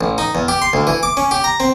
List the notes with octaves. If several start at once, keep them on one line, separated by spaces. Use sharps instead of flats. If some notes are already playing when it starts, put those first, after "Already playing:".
A1
D#4
E2
G4
C6
D2
E3
D6
C#4
G4
A#5
C4